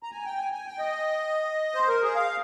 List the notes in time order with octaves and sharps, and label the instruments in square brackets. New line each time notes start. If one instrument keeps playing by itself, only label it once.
[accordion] A#5
G#5
G5
G#5
G#5
G5
D#5
C5
A#4
G#4
F5